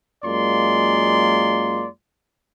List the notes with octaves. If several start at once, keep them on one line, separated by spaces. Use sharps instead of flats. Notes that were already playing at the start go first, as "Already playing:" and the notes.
F#2 G#3 A#3 F4 D5 C6